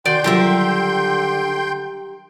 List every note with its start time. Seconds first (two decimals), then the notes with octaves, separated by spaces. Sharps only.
0.06 D#3 F#4 D5 G5 C6 G6
0.24 D3 F#3 G3 F4 G4 A#4 E5